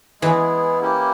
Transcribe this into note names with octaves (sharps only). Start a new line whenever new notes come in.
E3 G#3 B3 E4 G#4
A#3 C#4 E4 G4